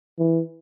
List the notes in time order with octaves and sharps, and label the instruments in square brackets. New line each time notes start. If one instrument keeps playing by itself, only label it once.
[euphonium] E3